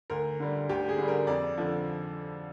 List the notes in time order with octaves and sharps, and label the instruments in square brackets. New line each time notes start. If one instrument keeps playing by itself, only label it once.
[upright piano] D2 A#4
D3 G3
D2 G4
G#4
D3 G3
A#4
F2 D5
D3 F3